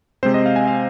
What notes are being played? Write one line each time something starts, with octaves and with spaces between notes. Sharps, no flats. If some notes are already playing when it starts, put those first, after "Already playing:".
C3 G#3 C4 C5
D#5
F5
G#5
F5